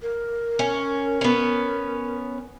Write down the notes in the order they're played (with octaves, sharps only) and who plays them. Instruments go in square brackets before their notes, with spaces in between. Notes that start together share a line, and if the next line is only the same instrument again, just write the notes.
[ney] A#4
[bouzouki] C#4
B3 C#4